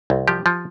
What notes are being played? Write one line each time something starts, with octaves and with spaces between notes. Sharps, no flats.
C2
F3 G4
F3